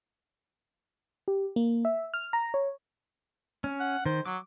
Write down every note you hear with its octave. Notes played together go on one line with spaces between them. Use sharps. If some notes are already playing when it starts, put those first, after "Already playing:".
G4
A#3
E5
F6
A#5
C#5
C#4
F#5
D#3 C5
F#3 D6